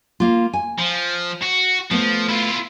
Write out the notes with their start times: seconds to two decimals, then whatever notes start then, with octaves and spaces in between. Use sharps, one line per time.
0.20 A#3 F4
0.53 G#5
0.79 F3
1.43 F#4
1.91 F3 A3 B3
2.29 E4 F4